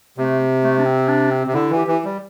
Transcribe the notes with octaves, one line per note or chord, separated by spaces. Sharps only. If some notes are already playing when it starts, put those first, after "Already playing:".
C3 A3
A3
D4
C4
D4
C4
C3
D3 E4
E3
G4
E3
G3